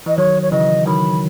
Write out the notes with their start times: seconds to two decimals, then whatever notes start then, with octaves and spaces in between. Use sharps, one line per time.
0.06 E3 D#5
0.18 D#3 F#3 C#5
0.42 C#5
0.52 C#3 E3 D#5
0.86 D#3 F#3 B5